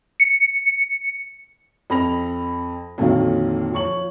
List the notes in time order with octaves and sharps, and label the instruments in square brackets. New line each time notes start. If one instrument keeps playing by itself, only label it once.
[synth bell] C#7
[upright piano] F2 B5 A#6 F7
F2 A#2 D3 D#3 F#3 F4
F3 C#5 C#6 F#7